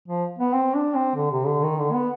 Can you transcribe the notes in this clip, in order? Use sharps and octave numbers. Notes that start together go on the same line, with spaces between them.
F3
B3
C4
D4
C4
D3
C3
D3
D#3
D3
B3